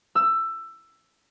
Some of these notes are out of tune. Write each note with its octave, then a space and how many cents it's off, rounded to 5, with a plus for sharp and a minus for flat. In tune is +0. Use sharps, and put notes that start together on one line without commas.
E6 +15